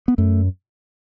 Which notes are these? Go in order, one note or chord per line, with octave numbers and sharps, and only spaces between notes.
B3
F#2 A3